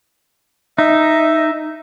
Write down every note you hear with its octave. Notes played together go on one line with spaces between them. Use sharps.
D#4 E5